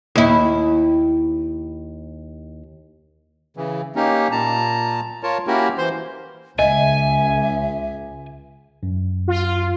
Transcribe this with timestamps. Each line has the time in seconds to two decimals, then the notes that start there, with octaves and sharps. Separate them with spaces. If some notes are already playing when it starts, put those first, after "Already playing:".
0.15 D#2 E4
3.57 C#3 E3
3.95 A#3 C#4 D#4 G4
4.31 A#2 A5 A#5
5.23 F4 A#4 C#5 A5
5.47 A#3 C#4 E4 F#4 G4 A#4
5.78 E3 C5 C6
6.59 C#2 D#5 E5 G#5
8.83 F#2
9.28 F4